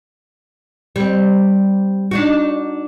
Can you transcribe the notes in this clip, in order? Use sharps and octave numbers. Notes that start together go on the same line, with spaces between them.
G3 C4
D4 D#4 F#4